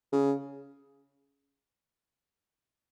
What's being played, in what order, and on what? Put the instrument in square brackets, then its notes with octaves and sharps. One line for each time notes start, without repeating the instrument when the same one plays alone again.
[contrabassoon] C#3